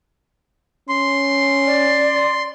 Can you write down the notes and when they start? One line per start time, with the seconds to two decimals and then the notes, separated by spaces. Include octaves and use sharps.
0.89 C#4 C6
1.66 D5